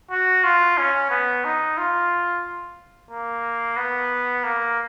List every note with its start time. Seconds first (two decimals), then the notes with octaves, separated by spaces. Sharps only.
0.11 F#4
0.44 F4
0.78 C#4
1.10 B3
1.45 D#4
1.78 F4
3.11 A#3
3.77 B3
4.44 A#3